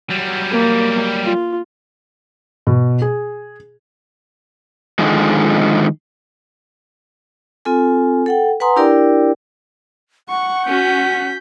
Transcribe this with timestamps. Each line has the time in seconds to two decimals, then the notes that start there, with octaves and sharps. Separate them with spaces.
0.10 F#3 G3
0.52 A#3
1.25 F4
2.67 B2
3.02 G#4
4.99 D3 D#3 F3 G#3
7.65 C4 F4 A4 G#5
8.26 A4 F#5 G5
8.60 B4 F#5 G#5 A#5 C6 D#6
8.76 D4 E4 G4 A#4 D5 G5
10.29 F#5 C#6
10.66 C#4 F#4 G6 B6